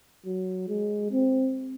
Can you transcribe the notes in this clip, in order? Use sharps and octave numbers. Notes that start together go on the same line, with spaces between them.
F#3
G#3
C4